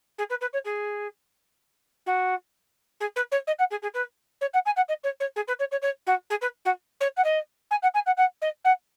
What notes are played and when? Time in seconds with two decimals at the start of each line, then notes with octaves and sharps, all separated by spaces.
0.18 G#4
0.30 B4
0.41 B4
0.53 C#5
0.65 G#4
2.06 F#4
3.00 G#4
3.16 B4
3.31 C#5
3.47 D#5
3.59 F#5
3.71 G#4
3.82 G#4
3.94 B4
4.41 C#5
4.54 F#5
4.65 G#5
4.76 F#5
4.88 D#5
5.03 C#5
5.20 C#5
5.36 G#4
5.48 B4
5.59 C#5
5.71 C#5
5.82 C#5
6.06 F#4
6.30 G#4
6.41 B4
6.65 F#4
7.00 C#5
7.17 F#5
7.24 D#5
7.71 G#5
7.82 F#5
7.94 G#5
8.06 F#5
8.17 F#5
8.41 D#5
8.64 F#5